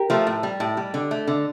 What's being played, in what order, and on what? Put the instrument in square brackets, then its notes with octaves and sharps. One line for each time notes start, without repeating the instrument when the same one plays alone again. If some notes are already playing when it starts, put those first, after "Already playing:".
Already playing: [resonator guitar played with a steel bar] G4 A#4
F3 A3
A2
G3
A2
G3
D3
A3
D3